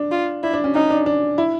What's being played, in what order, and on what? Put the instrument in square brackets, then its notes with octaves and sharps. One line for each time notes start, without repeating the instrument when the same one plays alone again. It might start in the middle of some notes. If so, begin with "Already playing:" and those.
Already playing: [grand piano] D4
[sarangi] F4
[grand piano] D4 [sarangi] E4
[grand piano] D4
C#4
[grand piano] C#4 [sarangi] D#4
[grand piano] D4
D4
E4